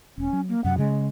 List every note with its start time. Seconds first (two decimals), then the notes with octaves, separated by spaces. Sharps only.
0.18 E1 C#4
0.33 F#3
0.49 A#3
0.64 F#2 C3 F#3 F#5
0.78 C#3 G#3